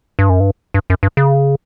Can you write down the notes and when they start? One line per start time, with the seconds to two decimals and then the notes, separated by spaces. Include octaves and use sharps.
0.19 G2
0.30 F#2
0.40 G2
0.74 G2
0.90 F#2
1.03 G2
1.17 C#3